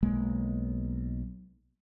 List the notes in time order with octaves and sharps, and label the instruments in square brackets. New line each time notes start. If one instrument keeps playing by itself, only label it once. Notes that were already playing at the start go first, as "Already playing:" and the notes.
[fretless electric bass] B1 G#3 A#3